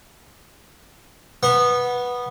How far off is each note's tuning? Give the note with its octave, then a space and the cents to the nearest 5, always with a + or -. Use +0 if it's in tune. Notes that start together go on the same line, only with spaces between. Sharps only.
B3 -10 C#6 -35